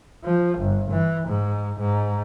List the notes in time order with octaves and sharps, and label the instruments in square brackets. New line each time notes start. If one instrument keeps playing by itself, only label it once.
[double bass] F3
G1
E3
G#2
G#2